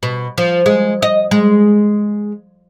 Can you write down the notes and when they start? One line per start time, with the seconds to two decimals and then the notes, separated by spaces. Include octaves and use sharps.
0.03 B2
0.38 F3
0.66 G#3
1.02 D#5
1.31 G#3